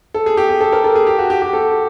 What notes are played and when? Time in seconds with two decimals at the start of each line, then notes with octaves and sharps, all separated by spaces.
0.14 A4
0.26 G#4
0.37 G4
0.49 G#4
0.60 A4
0.72 A#4
0.84 A4
0.95 G#4
1.07 G4
1.18 F#4
1.30 G4
1.42 G4
1.53 A4